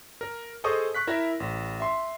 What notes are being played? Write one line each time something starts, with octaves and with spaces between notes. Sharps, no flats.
A#4
G#4 A4 C5 D#5 C#6 D#6
C#6 F#6 B6
E4 A#4 E5 A#6
A1
E5 C6